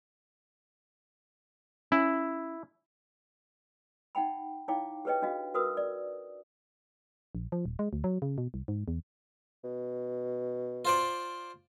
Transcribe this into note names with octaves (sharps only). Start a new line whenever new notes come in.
C#4 E4
D#4 F#5 G5 B5
D#4 E4 C#5 F5 G5 D6
G4 G#4 B4 C#5 D#5 G5
D4 F#4 D#5 F5
F#4 A#4 B4 D#6 E6
D5
A#1
F3
D#1
G#3
D2
F#3
C#3
B2
C2
G#2
E2
B2
F4 C5 D5